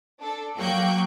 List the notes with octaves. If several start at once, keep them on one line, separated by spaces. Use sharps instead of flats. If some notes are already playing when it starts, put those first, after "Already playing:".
D4 A4
F#3 A#3 G5 C#6 F#6 G6